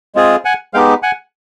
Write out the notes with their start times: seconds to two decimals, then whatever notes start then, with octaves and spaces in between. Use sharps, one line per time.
0.15 G#3 C4 F4 G#4
0.45 F#5 G#5
0.74 G#3 B3 D#4 G4 F5 G5
1.03 F#5 G#5